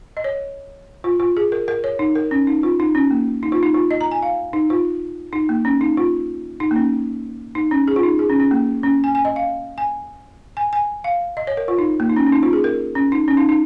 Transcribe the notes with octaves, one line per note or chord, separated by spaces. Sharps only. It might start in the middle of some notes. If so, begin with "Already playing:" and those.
D#5
C#5
F4
F4
G#4
A#4
A#4
C#5
D#4
A#4
C#4
D#4
F4
D#4
C#4
A#3
D#4
F4
D#4
F4
D#5
A#5
G#5
F5
D#4
F4
D#4
A#3
C#4
D#4
F4
D#4
A#3
C#4
D#4
C#4
G#4
F4
D#4
G#4
C#4
C#4
A#3
C#4
G#5
G#5
D#5
F5
G#5
G#5
G#5
F5
D#5
C#5
A#4
F4
D#4
A#3
D#4
C#4
C#4
D#4
F4
G#4
A#4
C#4
D#4
C#4
D#4
D#4